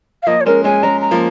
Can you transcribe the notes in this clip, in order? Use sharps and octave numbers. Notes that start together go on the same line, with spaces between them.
F5
F3 A#3 D#5
C#5
G#3 C#4 A#4
G#3 C#4 G#5
G#3 C#4 A#5
A#5
F3 A#3